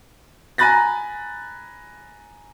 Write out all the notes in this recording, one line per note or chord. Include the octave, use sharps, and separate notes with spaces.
G#5 A#5 B5 F#6 A6 A#6